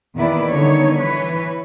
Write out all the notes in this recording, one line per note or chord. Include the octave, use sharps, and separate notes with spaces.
E2 A#2 D#3 E4 B4 D5
D3 D#3 G3 B3 D#4 C#5
E3 B4 C#5